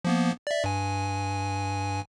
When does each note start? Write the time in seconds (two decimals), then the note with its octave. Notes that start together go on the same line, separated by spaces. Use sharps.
0.05 F3 A#3 B3
0.47 D5 E5
0.64 G2 G#5